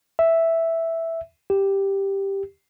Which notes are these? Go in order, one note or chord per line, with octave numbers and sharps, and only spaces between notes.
E5
G4